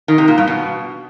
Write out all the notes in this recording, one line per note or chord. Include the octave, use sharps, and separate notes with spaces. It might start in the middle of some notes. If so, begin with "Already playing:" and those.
D#3
C3
A#2
G2
B2